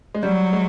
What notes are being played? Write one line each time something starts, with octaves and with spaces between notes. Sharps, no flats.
G#3
F#3 G3
G#3